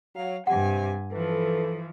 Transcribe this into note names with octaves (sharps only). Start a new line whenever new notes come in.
F#3 F5
G2 C3 G4 F#5 G#5
E3 F3 A4 B4